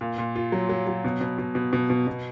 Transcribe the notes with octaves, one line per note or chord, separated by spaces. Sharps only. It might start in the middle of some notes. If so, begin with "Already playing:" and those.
A#2
A#2
F4
F#3
F#3
F#3
B2
B2
B2
B2
B2
B2
B2